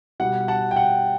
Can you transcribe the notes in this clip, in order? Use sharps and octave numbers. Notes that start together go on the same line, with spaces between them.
B2 G3 F#5
F#5 A5
G5
F#5